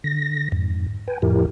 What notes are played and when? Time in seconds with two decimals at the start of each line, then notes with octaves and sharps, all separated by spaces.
0.04 D3 A#6
0.52 F2 G#2
1.08 B4 G5 G#5
1.22 F2 A2 F3 E4 G4 A#4